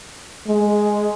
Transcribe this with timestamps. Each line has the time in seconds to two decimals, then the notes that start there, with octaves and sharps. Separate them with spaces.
0.47 G#3